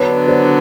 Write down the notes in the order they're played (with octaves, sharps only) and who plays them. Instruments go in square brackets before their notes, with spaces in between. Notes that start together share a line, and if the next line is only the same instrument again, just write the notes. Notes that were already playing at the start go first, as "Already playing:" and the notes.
Already playing: [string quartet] D3 F#3 B3 D4 [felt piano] B4 C#5
[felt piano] C5 D5